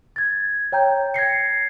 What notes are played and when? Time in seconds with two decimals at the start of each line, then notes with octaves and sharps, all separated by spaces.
0.16 G#6 A6
0.72 C#5 G5 A#5 G6
1.14 G#6 A#6 C7 C#7